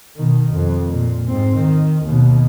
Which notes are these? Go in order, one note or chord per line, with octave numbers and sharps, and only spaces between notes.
B2 D#3
F2
A#2
G#2 C4
D#3
D#2 B2